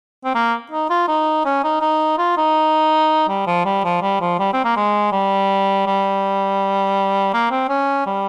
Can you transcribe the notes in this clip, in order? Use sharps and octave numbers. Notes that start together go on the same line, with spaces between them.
C4
A#3
D#4
F4
D#4
C#4
D#4
D#4
F4
D#4
G3
F3
G3
F3
G3
F3
G3
C4
A#3
G#3
G3
G3
A#3
C4
C#4
G3